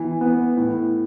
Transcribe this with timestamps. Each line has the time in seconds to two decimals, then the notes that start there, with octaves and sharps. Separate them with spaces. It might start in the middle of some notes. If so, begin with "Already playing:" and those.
Already playing: E3 B3
0.21 B3
0.57 A2